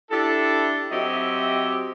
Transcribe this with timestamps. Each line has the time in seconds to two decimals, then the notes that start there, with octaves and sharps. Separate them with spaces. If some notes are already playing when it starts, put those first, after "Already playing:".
0.11 D4 E4 G4 A4
0.91 F#3 C4 G4 D#5 E5